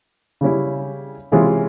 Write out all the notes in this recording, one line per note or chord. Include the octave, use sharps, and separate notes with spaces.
C#3 G3 C#4 E4
C3 E3 G#3 C#4 F4